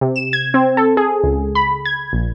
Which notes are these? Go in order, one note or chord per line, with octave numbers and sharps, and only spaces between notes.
C3
E7
G#6
C4
A4
G#4
C#2
B5
G#6
A#1